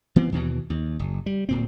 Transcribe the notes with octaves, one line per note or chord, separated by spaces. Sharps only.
E3 B3 C4
D#2 B2 E3
D#2
F#1
G3
D1 A#2 C4